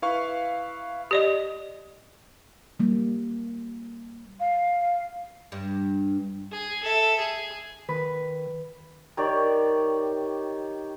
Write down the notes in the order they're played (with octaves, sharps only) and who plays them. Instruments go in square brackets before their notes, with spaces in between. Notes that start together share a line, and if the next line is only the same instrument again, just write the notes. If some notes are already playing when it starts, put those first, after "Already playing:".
[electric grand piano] E4 B4 F5 C#6
[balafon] G4 D5 D#5
[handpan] G3 A#3
[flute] F5
[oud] G2 D4
[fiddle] G#4
A4 E5
G#4
[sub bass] D#3 [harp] B4
[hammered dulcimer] D#3 G4 C#5 D5